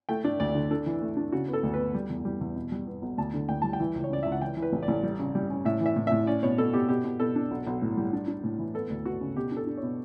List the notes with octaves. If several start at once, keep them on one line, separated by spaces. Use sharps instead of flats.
A3 G5
D4 D5
D2 D5
D3
D4 A4
E3
A3
D4
C#3 F#4
B3
A4
D2
B4
B3
G3
E2
G3
E2
B2
G3
B3
B1
D2 A5
D3
D2 G5
G3 A5
G5
E3
C#2
C#5
C#3 D5
C#2 E5
F#5
E3 G5
E3
B4
A1
D5
A1
G3
C#3
G3
C#4
A2 E5
E3
E5
A2
A2 E5
C#4 D5
B2 C#5
B2 A4
B2 G4
B2 G4
B2
B2 A4
D4
B1
B1
A2
G3
D4
D4
A2
E3
B3 A4
D2
B3 F#4
C#3
B2 G4
D4
A4
D4
B2 C#5